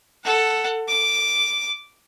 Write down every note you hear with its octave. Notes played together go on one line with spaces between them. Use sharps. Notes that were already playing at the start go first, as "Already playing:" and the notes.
A4 F#5
D6